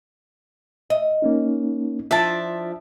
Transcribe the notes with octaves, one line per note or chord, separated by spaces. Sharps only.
D#5 E5
A#3 C#4 D#4
F3 D4 E4 F4 E5 A5